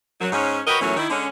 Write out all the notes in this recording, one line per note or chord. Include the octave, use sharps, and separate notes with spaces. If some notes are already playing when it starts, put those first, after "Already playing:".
F#2 F#3
G#2 C#4
F#4 G4 A#4 B4 C#5 D#5
E2 A#2 E3 F#3 A3 C#4
D#3 E4
D3 G#3 C#4